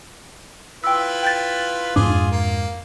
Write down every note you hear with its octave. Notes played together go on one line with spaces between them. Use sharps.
E4 F4 B4 G5 E6
G5 G6 A6
F2 G#2 D4 F4 G#4 D6
A#3